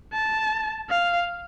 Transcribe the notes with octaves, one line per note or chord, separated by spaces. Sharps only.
A5
F5